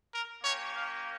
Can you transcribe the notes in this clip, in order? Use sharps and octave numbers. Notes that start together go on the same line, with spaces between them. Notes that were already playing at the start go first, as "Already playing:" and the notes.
A#4
A#3 C#4 G4 C#5
F5